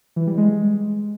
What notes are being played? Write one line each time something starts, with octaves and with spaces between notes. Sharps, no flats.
E3
G3
G#3